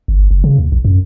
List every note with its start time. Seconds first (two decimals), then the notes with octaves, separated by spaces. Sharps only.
0.08 G1
0.31 F#1
0.44 C#3
0.58 D#2
0.72 A#1
0.85 F#2